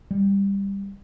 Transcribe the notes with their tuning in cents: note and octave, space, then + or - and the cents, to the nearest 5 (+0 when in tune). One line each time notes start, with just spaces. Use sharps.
G3 +15